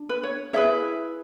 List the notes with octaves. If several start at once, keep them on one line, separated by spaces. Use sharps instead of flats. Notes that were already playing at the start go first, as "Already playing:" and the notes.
Already playing: D4
B4
C#5
E4 G#4 B4 C#5 E5